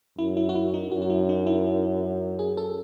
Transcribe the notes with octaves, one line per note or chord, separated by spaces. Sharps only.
F#2 E4
E4
F#4
E4
D#4
F#2 F#4
F#4
E4
D#4
E4
G#4
A4